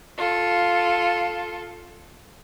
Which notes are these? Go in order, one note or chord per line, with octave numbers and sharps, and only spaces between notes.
F4 A4